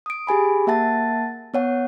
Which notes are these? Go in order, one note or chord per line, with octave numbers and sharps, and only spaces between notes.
D#6 D7
G4 G#4 G#5 B5
A#3 E5 F#5 A5 A6
B3 C#5 F#5